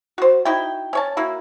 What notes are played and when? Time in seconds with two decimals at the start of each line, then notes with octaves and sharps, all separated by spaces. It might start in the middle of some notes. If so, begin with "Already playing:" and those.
0.18 F#4 C5
0.45 D#4 E4 F#4 G5
0.93 C#4 C#5 A5
1.17 A#3 E4 F#4